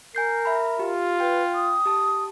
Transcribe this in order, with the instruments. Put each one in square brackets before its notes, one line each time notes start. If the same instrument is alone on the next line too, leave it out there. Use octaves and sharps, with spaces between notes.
[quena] A#4 [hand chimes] G#5 G6 C7
[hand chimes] E5 B5
[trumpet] F4 [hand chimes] G4
[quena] B4 [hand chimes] G5
[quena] D#6
[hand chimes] G4 A5